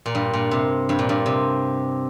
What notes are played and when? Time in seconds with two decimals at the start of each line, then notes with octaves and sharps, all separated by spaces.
0.06 A#2
0.15 G2
0.33 A#2
0.51 C3
0.89 G2
0.99 A#2
1.09 G2
1.26 C3